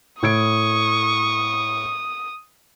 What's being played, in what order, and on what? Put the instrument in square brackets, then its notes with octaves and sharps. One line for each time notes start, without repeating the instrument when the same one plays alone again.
[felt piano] A2 G#6 D7 [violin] C#6 [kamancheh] D#6